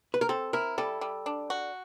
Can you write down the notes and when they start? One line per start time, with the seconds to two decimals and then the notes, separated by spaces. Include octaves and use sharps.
0.14 B4
0.21 A#4
0.29 C4 A4
0.53 E4 A#4
0.78 G3 A4
1.01 G3
1.26 D4
1.50 F#4